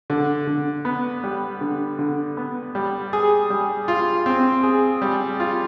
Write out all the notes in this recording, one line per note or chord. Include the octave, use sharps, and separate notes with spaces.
D3
D3
B3
G3
D3
D3
B3
G3
G#4
G3
F4
C4
G#4
G3
F4